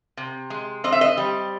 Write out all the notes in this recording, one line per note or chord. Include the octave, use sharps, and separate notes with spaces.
C3
G#3
C4 D#5
E5
D#5
G3